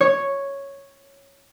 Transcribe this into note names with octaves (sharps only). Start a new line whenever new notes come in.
C#5